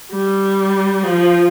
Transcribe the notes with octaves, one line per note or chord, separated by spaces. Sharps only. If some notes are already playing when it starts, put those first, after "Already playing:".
G3
F3